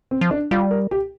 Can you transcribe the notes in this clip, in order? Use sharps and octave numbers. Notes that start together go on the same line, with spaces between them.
C4
F3
D4
G3 F4
A#4
G4